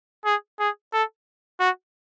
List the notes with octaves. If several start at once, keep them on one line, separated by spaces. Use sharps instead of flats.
G#4
G#4
A4
F#4